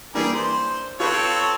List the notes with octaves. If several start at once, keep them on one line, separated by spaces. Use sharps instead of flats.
E3 G3 A#3 D4 G#4 A#4
C5
C4 F4 A4 B4 C#5